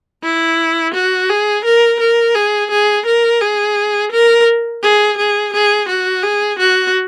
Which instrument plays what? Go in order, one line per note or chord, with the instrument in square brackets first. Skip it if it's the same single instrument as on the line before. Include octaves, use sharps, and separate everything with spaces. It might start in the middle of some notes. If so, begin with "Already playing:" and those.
[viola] E4
F#4
G#4
A#4
A#4
G#4
G#4
A#4
G#4
A#4
G#4
G#4
G#4
F#4
G#4
F#4